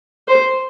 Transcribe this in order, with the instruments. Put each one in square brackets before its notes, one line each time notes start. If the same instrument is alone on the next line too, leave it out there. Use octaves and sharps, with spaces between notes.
[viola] C5